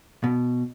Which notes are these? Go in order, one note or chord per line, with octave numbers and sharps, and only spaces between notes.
B2